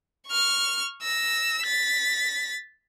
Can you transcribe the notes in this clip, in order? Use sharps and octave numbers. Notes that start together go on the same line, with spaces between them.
C#6 F6
E6 A#6
A6 B6